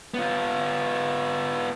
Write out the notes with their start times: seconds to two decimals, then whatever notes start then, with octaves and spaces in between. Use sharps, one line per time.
0.14 B3 F4